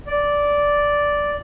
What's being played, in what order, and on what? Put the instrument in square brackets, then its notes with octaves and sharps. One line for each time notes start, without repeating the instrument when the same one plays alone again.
[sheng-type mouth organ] D5